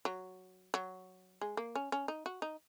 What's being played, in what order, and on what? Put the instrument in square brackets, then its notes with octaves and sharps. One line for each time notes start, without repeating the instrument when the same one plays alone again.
[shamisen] F#3
F#3
G#3
A#3
C#4
C#4
D#4
F#4
D#4